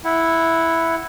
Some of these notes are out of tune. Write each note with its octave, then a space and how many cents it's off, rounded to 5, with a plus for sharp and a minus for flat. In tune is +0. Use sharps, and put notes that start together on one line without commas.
E4 +0 F#5 +0